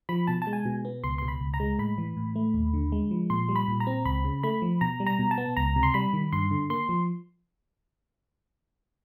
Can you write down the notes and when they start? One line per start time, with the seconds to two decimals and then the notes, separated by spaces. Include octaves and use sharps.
0.09 F3 B5
0.27 B2 A5
0.42 A5
0.47 G#3
0.53 G#5
0.66 B2
0.85 B3
1.04 C#2 C6
1.18 B2 C6
1.28 B5
1.41 C#2
1.54 A#5
1.60 G#3
1.79 A2 B5
1.98 E3
2.17 A2
2.36 A3
2.54 D#2
2.74 D3
2.92 G#3
3.11 F3
3.30 A#2 C6
3.49 G3
3.56 B5
3.68 A#2
3.80 A#5
3.87 C4
4.05 C#2 B5
4.24 C#3
4.43 A3 B5
4.62 F3
4.81 B2 A#5
5.00 G3
5.07 A#5
5.19 B2
5.31 A5
5.38 B3
5.57 C#2 A#5
5.76 C3
5.83 C6
5.94 G3 B5
6.13 D#3
6.32 G2 C6
6.51 D3
6.70 A#3 C6
6.89 F3